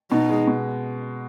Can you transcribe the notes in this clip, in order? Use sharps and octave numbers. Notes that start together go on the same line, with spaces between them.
B2 D#4
G#3
B2